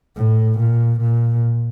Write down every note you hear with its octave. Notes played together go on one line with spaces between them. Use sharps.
A2
A#2
A#2